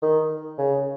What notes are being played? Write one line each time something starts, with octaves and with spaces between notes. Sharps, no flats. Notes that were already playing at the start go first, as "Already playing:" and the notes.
D#3
C#3